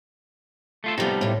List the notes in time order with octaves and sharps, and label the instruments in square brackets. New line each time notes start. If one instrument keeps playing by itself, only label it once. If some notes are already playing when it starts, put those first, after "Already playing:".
[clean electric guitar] A3 F4 A4
[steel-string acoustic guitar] C3 F3 [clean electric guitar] G3 B3 D#4
[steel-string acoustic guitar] A2 C3